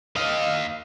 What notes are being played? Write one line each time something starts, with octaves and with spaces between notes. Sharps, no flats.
D#5 F5